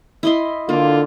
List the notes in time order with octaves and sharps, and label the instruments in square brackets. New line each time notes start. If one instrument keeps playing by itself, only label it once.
[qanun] E4 D#5 C6
[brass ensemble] D3 F4 [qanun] A#3